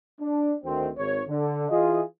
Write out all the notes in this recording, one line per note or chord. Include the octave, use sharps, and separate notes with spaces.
D4
D2 D#3 C4
G#1 C#5
D3
E3 F4 G#4 D#5